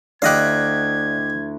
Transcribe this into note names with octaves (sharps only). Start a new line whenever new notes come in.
D2 E4 G4 D5 D#5 F5 F#6 G#6